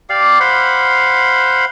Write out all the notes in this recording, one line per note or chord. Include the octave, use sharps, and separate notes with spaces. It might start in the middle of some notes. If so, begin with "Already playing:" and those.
G4 D5 F5
C5 F5 F#5 B5